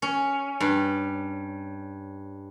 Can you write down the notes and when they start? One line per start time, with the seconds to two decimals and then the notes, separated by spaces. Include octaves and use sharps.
0.02 C#4
0.60 G2